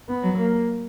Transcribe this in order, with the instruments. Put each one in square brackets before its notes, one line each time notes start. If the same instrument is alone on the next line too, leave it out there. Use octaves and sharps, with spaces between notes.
[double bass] B3
[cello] F#3
[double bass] A#3